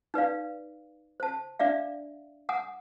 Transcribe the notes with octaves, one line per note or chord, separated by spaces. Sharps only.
D#4 B4 D5 F5
C5 A5
D4 D5 E5 F5
F#5 G#5 D#6